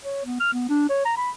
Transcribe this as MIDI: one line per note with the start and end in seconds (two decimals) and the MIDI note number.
0.04 0.21 73
0.25 0.39 59
0.40 0.51 89
0.53 0.67 59
0.69 0.89 62
0.90 1.03 73
1.05 1.13 82
1.17 1.31 83